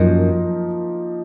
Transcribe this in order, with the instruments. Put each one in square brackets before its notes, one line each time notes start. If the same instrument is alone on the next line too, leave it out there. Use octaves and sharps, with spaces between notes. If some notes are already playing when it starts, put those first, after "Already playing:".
Already playing: [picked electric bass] F#2 [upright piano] F3 A#3 D#4